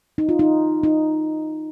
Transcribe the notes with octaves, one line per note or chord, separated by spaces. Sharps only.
D#4
F4
D#4
D#4